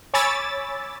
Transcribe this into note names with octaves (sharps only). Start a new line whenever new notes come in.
C#5 G#5 B5 D6 E6 A6